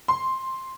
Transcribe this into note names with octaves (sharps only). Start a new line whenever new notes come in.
C6